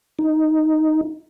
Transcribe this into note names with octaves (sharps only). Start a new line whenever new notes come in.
D#4